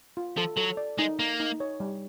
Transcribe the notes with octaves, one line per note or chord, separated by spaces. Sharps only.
F4
F3 A4
F#3 A4
D5
G#3 D#4
A#3 D#4
D#4
C#5
G3